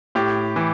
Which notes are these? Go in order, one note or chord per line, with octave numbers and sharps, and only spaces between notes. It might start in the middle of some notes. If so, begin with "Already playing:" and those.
A2 G4
E3